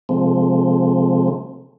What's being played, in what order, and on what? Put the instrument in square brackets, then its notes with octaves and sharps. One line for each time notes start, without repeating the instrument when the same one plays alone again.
[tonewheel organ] C3 F3 G#3 A3 C4